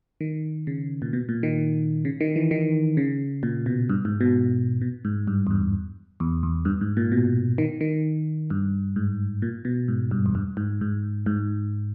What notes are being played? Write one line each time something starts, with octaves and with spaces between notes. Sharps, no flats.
D#3
C#3
A#2
B2
A#2
D#3
C#3
D#3
E3
D#3
C#3
A#2
B2
G2
G#2
B2
B2
G#2
G2
E2
G2
E2
E2
G2
G#2
A#2
B2
D#3
D#3
G2
G#2
A#2
B2
G#2
G2
E2
G2
G#2
G#2
G#2